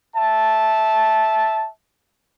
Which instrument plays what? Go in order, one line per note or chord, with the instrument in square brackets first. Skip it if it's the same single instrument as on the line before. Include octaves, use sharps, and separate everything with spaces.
[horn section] E5 A5